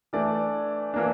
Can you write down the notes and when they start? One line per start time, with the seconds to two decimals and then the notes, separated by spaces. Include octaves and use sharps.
0.13 E3 A3 D4 D5
0.94 E3 A#3 D4